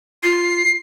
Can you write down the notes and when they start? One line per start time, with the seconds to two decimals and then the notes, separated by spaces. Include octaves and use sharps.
0.23 F4 C7